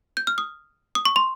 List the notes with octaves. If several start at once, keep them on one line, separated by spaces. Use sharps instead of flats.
G6
F6
D#6
D#6
C#6
C6